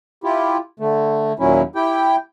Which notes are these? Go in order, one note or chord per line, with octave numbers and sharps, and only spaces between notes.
E4 F4 G4
D3 A3
D#2 A#2 F#3 C#4 E4
E4 G4 G5